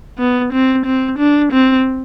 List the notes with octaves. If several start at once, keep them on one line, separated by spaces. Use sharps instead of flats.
B3
C4
C4
D4
C4